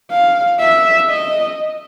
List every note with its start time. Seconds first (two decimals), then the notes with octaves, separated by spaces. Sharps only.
0.11 F5
0.60 E5
1.10 D#5